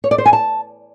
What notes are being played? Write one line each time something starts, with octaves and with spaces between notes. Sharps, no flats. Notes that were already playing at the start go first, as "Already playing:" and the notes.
C#5
D5
C5
G#5
A5